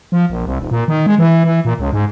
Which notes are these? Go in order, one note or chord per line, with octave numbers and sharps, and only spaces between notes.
F3
A#1
C2
D#1
A#2
D#3
G#3
E3
E3
A#2
C#2
G#2